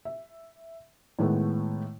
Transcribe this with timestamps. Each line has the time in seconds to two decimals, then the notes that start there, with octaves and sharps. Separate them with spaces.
0.05 E5
1.19 A2 D#3 G#3 A3 B3